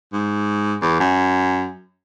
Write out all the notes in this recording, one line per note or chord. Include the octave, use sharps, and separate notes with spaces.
G#2
E2
F#2